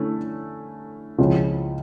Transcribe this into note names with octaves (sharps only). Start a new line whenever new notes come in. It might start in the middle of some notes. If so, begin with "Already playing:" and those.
Already playing: D3 A3 C#4 E4
C#2 C#3 F3 C#4 E4